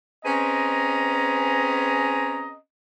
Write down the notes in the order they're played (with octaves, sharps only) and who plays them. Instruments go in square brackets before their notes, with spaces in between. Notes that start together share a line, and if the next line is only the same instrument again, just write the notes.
[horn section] C4 C#4 G#4 B4 D#5 A#5